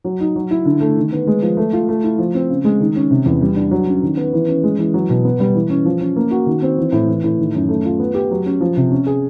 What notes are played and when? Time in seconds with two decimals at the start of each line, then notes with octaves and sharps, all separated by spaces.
0.04 F#3
0.20 D#4
0.36 F#3
0.51 E4
0.65 D3
0.81 A3
0.97 D#3
1.12 B3
1.27 G#3
1.42 F3
1.57 A3
1.73 F4
1.89 A3
2.04 E4
2.18 F3
2.34 C4
2.50 C#3
2.64 G#3
2.80 D#3
2.96 C#4
3.11 C3
3.26 E2
3.42 G3
3.56 D4
3.71 F#3
3.88 C#4
4.03 D#3
4.17 B3
4.33 E3
4.48 C#4
4.64 G#3
4.79 E3
4.94 F#3
5.09 B2
5.24 B3
5.40 G3
5.55 E3
5.70 C#4
5.85 F3
6.01 C#4
6.16 A#3
6.31 F#4
6.46 D#3
6.62 C4
6.78 E3
6.92 A2
7.08 E3
7.24 A2
7.39 D#3
7.55 F#2
7.69 A3
7.85 F4
7.99 B3
8.15 G4
8.31 F#3
8.46 C#4
8.60 F3
8.77 C3
8.91 C#4
9.07 G#4